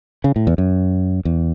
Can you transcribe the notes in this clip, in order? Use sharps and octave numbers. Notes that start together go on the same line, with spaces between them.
C#3
A2
E2
F#2
E2